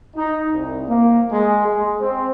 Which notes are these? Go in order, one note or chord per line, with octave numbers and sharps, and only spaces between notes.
D#4
C2
A#3
G#3
G#3
C4